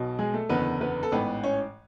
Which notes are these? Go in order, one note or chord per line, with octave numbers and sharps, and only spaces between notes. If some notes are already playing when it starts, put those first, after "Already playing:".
Already playing: B1 B2
G#3 G#4
A3 A4
F#1 E2 D3 B3 B4
B3 B4
A4
A1 G#2 E3 B3 B4
C#4 C#5